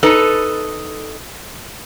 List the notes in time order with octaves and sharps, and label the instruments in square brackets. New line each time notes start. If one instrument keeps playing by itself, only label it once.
[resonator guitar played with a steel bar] D#4 A4 B4